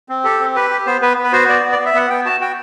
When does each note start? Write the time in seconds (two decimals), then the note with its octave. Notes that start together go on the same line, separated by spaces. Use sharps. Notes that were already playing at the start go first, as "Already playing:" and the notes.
0.09 C4
0.24 G4 A4
0.39 C4
0.55 G4 B4
0.70 G4
0.86 B3 C5
1.01 B3 B4
1.18 B3
1.24 B4
1.32 F#4 C5
1.49 B3 D5
1.64 B3
1.72 D5
1.79 B3
1.86 E5
1.94 B3 F#5
2.10 B3 G5
2.25 F#4 A5
2.40 F#4 G5